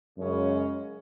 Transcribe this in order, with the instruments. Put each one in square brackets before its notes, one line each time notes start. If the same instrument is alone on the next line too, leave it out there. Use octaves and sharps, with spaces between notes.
[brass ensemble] F#2 C#3 G#3 C#4